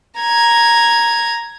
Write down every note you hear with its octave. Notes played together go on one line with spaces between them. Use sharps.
A#5 G#6